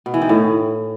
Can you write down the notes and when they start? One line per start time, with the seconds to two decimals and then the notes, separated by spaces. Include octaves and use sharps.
0.06 B2
0.14 E3
0.22 D#3
0.29 A2